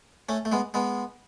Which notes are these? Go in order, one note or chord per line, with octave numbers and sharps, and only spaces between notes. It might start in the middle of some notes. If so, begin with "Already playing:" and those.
A3 C#4
A3
G#3 B3
G#3 B3